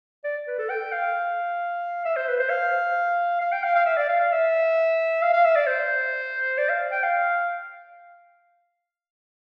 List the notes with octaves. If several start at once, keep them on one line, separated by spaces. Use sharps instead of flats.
D5
B4
A4
G5
F5
E5
C5
B4
C5
F5
F5
G5
F5
F5
E5
D5
F5
F5
E5
F5
F5
E5
D5
C5
D5
F5
G5
F5